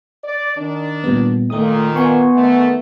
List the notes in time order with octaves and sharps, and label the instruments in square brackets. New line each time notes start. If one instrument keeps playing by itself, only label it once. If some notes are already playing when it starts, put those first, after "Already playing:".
[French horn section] D5
D#3 D4
[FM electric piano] A#2 G3 B3
[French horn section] A#2 D#3 [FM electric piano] A3 D#6
[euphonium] B3 [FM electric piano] G#5 C6 C#6
[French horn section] D#3 A3